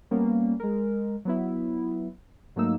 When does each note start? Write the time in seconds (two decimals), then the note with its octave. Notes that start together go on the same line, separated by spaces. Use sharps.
0.11 G3 A#3 B3 C#4
0.60 G#3 A#4
1.25 F#3 B3 E4
2.56 G#2 F#3 A3 A#3 D#4 E6